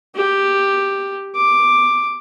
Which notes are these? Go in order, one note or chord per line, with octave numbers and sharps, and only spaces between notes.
G4
D6